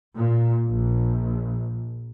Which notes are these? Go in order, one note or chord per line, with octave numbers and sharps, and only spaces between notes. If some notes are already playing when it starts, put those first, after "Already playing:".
A#2
A#1